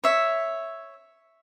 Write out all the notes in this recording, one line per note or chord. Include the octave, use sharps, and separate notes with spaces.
C#5 E5